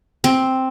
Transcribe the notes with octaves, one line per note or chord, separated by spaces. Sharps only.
C4